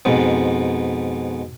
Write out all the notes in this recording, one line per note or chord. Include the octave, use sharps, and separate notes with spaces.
F2 G#2 B2